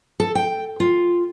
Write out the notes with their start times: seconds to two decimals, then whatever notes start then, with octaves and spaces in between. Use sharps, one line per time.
0.20 A4
0.35 G5
0.80 F4